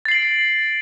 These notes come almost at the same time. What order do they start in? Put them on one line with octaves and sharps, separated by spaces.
A6 C7 F#7 D7